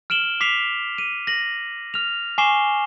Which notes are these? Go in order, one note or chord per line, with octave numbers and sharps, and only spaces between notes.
F6 D7 E7 F#7 G7
D6 B6 C7 F7
D#7
A#6 F#7
F6 F7
G#5 C#6 D6 C7 E7 G7